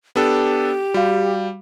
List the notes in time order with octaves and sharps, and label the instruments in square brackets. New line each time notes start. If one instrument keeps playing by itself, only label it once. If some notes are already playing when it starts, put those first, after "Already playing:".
[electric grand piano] B3 D4 A4 [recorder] G4
[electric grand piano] G3 [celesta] F#4 F5